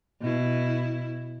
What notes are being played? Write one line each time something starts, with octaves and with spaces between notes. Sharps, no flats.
B2 E4